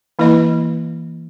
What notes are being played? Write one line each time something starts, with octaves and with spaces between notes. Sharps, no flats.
E3 A#3 E4 B4 D#5